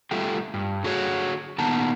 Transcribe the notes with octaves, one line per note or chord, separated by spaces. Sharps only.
G3 A3 F4 G4 G5
G2
D3 F#4 G#4 C5 C#5
A#2 D#3 B3 A5 A#5